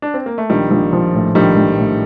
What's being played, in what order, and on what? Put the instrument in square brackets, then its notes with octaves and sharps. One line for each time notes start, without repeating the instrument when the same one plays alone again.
[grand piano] D4
C4
A#3
A3
[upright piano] A#1 [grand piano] D#3 G3
[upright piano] A#1
F3
A2
[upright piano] A#1 [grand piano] D#3 G3
[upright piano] A#1
A2